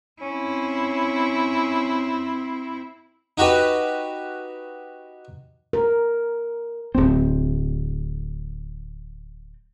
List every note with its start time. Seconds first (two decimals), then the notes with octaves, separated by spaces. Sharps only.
0.22 C4 C#4 E4
3.38 D#4 F#4 G4 B4
5.73 A#4
6.95 D1 C4